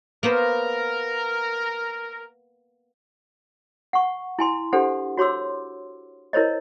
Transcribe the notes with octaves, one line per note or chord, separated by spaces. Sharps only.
A#3 B3 A#4 C5
F#5 C#6
E4 G#5 C6
D4 G4 A4 C5 F#5
F#4 C#5 C6 D6 E6
E4 A#4 C5 C#5 D#5